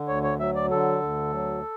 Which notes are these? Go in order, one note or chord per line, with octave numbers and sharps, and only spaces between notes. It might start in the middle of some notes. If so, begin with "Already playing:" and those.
Already playing: D3
D2 C#5
C#5
F#3 E5
D5
D3 A4
D2
F#3